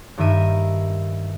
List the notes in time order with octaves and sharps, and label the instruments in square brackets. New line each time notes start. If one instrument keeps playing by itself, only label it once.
[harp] G2 D#3 A#4 E5 D#7